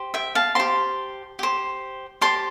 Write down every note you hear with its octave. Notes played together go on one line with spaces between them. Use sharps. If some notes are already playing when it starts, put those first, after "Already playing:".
Already playing: G4 C5
E5 G5
F5 A5
G4 C5 A5 C6
G4 C5
G4 C5 A5 C6